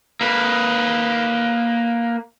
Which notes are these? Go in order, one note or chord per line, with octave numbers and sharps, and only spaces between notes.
A#3 B4